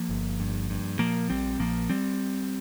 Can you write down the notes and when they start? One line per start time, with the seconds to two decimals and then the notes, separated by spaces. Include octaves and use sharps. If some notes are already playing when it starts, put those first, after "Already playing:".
Already playing: F3 A#3
0.09 G1
0.40 G2
0.70 G2
0.99 A#2 F3 A#3
1.30 A#1 G3 C4
1.59 A#1 F3 A#3
1.89 G3 C4